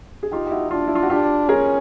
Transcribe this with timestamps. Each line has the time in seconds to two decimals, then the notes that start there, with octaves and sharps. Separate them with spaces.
0.23 G#4
0.32 D#4 F4 G4
0.46 G4
0.51 E4 F#4
0.71 D4 F4
0.87 E4
0.95 F4
1.03 F#4
1.10 D4 F4 G4
1.49 C#4 G#4 A#4